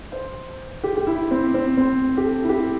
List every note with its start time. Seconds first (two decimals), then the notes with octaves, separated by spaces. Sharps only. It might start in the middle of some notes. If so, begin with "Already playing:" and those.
0.12 C5
0.84 G4
0.97 G4
1.07 E4
1.31 C4
1.54 C4
1.77 C4
2.17 G4
2.24 A4
2.44 E4
2.49 G4